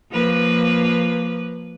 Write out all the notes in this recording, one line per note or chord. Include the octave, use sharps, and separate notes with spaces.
F3 A#3 B4